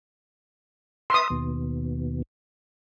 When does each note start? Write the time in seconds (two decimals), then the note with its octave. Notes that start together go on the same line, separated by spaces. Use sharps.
1.10 B4 E5 C6 D#6
1.30 D#2 B2